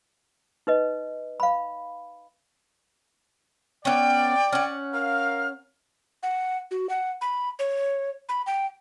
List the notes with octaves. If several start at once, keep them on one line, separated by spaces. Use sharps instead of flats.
D#4 B4 D#5
F5 B5
B3 C#4 D5 G5
C#4 F#5
A#4 F5 F6
F#5
F#4
F#5
B5
C#5
B5
G5